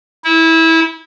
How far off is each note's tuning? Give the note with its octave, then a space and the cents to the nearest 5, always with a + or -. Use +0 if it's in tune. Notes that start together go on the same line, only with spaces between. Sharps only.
E4 -20